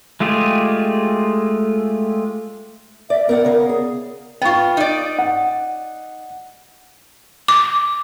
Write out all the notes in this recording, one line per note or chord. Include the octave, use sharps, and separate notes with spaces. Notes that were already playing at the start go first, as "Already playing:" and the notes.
G#3 A3 F4 G4 G#4
D5 E5
B3 A#4 D5 F#5
C#3 A#4 F5
G#4
B3 F4 G5 C#6
D#4 D5
F#5
D6